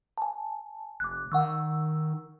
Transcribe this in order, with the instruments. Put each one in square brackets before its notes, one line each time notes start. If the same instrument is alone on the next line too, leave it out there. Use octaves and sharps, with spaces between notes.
[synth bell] G#5 A5
[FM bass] F1 [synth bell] D6 F#6
[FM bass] D#3 [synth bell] F#5 C#6 E6